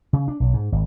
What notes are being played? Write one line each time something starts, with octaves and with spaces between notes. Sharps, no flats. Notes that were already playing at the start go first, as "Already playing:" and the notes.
C#3
D4
B1
G#2
G#1